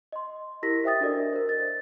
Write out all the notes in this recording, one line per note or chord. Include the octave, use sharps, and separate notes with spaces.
D#5 C6
E4 G4 A#4 A#6 B6
C5 E5 G5 D#6 A6
D4 F#4 A4 A#4 D5 D#5
A#4 C5
A6